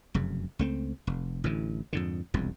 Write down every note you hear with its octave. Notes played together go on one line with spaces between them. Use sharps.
F1 F#2 C#3
C#2 A3 C4
F1
A1 A2 D3 E3
F2 G#2 D3
E1 C2 F2